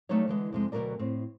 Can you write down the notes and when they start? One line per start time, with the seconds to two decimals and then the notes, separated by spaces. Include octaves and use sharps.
0.09 F#3 G3 A3 B3 D#4 C#5
0.28 D3 E3 G#3 B3
0.52 F2 C3 G#3
0.72 D2 B2 F3 F#3 A#4 D5
0.99 A2 C4